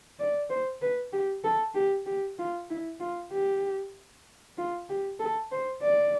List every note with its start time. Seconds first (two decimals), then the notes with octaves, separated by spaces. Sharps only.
0.19 D5
0.50 C5
0.82 B4
1.13 G4
1.44 A4
1.75 G4
2.06 G4
2.39 F4
2.70 E4
3.00 F4
3.32 G4
4.58 F4
4.89 G4
5.20 A4
5.52 C5
5.82 D5